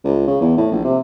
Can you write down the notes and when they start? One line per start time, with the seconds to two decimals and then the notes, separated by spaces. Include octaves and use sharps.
0.04 C#2
0.28 C#3
0.41 E2
0.57 A2
0.71 A#1
0.84 C3